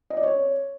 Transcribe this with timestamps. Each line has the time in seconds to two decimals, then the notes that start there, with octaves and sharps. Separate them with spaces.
0.10 D#5
0.17 D5
0.23 C#5